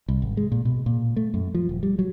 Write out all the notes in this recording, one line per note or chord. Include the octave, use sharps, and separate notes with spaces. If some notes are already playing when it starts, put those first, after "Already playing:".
C2
G#1
G#3
A#2
B2
A#2
A3
F#2
F3
D#1
G3
F#3